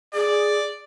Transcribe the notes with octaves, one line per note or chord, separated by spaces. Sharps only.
G#4 D5